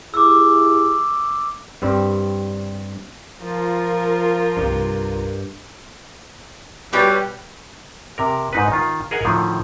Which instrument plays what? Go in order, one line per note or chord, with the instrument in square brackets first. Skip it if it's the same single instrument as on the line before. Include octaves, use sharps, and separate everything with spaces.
[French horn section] E4 G4 G#4 [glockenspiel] D6 E6
[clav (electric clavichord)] G2 G3 C4
[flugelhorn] F3 [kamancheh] F4 A#4
[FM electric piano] C2 G3 [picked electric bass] G2
[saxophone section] B2 G3 [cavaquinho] B4 C#5 G5
[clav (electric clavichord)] C3 A#4
G#2 D#4 B4
D#3 F4
G#4 A#4 D#5 F#5 G#5
A2 D3 D#3 F3